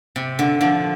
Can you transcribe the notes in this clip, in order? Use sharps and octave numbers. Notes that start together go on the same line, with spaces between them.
C3
D3
D3 F3